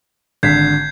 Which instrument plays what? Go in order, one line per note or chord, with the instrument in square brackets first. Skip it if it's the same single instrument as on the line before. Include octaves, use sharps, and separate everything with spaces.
[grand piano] G#1 D3 B6 [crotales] G6 G#6 C7